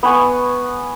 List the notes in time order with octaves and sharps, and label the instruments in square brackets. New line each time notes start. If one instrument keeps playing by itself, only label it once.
[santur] B3 B4 G#5 C#6